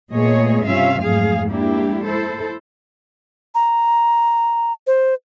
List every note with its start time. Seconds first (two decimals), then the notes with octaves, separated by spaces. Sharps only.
0.12 A#2 A3 B3 G#4 C#5 D#5
0.65 G2 C3 C#4 F4 E5 F5
1.01 F2 G#2 F#3 A3 G#4 F5
1.48 G#3 A#3 D4 E4 G4
2.05 E4 A4 C5
3.55 A#5
4.87 C5